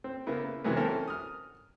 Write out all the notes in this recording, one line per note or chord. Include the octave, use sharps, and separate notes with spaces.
C4
C#3 A#3 B3 E4
C3 E3 F#3 G#3 A#3 B3
E3 C4 C#4 A4 A#4
D#6 F6